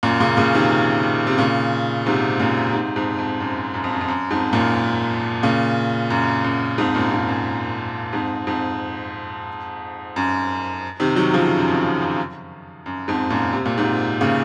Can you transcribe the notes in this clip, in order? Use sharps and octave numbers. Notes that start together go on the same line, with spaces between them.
F#2 A#2
A#2 C#3
A#2 C#3
C3 D#3
C3
A#2 C#3
G#2 C3
F#2 A#2
G#2 C3
F2 G#2
F2
F#2
F#2
F2
F#2
F2
F#2
F2 G#2
F#2 A#2
A#2 C#3
F#2
F#2
F2 G#2
F#2 A#2
F2 G#2
F#2
F2 G#2
F2 G#2
F#2
C3 D#3
D#3 F#3
C#3 F3
F#2
F2
F#2
F#2
F#2
F2 G#2
F#2 A#2
C3
A#2
G#2 C3
A#2 C#3